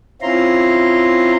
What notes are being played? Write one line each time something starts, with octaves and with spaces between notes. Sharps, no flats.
C4 C#4 E4 F4 A#5 C6